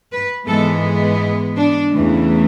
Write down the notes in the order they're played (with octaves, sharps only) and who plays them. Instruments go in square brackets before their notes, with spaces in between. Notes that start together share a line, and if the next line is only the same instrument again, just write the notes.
[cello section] B4
G#2 E3 G#3 B3 A4
D4
E2 C#3 E3 A3